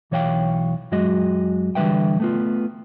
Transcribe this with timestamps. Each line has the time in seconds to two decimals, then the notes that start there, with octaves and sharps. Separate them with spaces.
0.11 B1 E3 C#5 F5 G5
0.91 F#2 F#3 G#3 F#4 D#5
1.75 D3 E3 G3 B4 E5 G5
2.20 A3 B3 F4